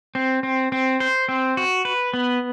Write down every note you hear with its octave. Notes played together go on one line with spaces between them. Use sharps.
C4
C4
C4
C5
C4
F#4
B4
B3